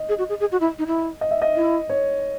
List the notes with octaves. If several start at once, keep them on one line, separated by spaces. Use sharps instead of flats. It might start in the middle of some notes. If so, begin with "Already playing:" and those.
Already playing: D#5
G#4
F#4
G#4
G#4
F#4
E4
D#4
E4
D#5
E5
D#5
E4
C#5